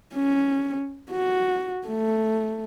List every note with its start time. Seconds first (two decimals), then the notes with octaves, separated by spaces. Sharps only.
0.14 C#4
1.11 F#4
1.87 A3